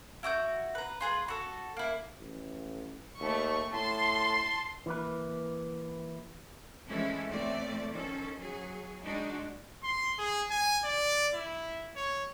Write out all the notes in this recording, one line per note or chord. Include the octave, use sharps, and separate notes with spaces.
E4 F#4 D#6 G6
B4 A#5
F4 G#4 B4
F#4 A4
A#3 E4
A1
D#2 A3 C#6
A2 A5 C6
E3 A#3 B4
E3 F3 G#3 A3 C#4 E4
E2 A2 A3 C4 D5
D#3 F3 C#4 A4
F#3 G#4
G#3 D4 D#4 F#4
C6
G#4
G#5
D5
E4
C#5